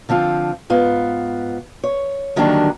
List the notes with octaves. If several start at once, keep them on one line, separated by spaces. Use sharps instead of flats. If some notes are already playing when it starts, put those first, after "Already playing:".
D3 F3 C4 F4
G#2 B3 F4
C#5
D3 D#3 F#3 G3 A#3 D4